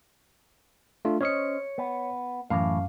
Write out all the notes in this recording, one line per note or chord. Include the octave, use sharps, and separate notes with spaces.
A3 D4 F4
C#4 C5 C#5 D#5 C#7
B3
F#2 A2 E3 F5